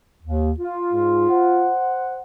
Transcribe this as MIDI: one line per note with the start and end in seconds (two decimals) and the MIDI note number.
0.22 0.51 39
0.58 1.69 65
0.93 1.26 44
1.29 2.20 72
1.29 2.20 78